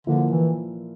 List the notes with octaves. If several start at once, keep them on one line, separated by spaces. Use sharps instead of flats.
A#2 D3 F3 A#3 E4 A#4
E3